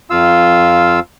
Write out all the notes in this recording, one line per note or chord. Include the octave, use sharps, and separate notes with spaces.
F2 F4 F5 E6